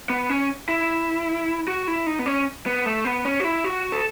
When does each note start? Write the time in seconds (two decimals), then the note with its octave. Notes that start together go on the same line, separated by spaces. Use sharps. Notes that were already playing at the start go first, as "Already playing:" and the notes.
0.10 B3
0.29 C#4
0.69 E4
1.68 F#4
1.88 E4
2.07 D#4
2.19 B3
2.26 C#4
2.66 B3
2.86 A3
3.05 B3
3.25 C#4
3.40 F#4
3.44 E4
3.64 F#4
3.92 A4